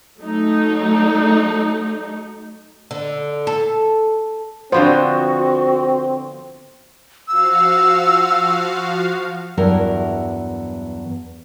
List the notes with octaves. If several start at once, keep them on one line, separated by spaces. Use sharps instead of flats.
F#3 A3 D#4
D3
A4
D3 F3 B3 C4 F#4 C5
F3 F#4 F5 E6
E2 G2 F#3 E4 F#4 A#4